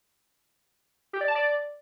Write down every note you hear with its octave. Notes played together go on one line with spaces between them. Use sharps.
G4
D5
A5
D5